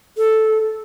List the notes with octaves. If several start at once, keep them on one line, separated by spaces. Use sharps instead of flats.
A4